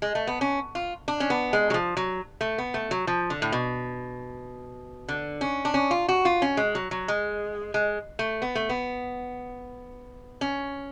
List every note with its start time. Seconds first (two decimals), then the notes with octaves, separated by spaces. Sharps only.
0.02 G#3
0.15 A3
0.27 B3
0.41 C#4
0.75 F4
1.08 D4
1.20 C#4
1.30 B3
1.53 G#3
1.70 F#3
1.74 F3
1.97 F#3
2.41 A3
2.58 B3
2.74 A3
2.91 F#3
3.07 F3
3.30 D3
3.42 A2
3.52 B2
5.09 D3
5.41 C#4
5.65 D4
5.74 C#4
5.91 F4
6.09 F#4
6.25 F4
6.42 C#4
6.57 G#3
6.75 F#3
6.91 F#3
7.08 G#3
7.74 G#3
8.19 A3
8.42 B3
8.55 A3
8.69 B3
10.41 C#4